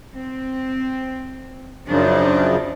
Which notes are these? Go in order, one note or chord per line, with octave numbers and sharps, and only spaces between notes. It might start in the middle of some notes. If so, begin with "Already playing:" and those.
C4
F#2 C#3 F3 D4 D#4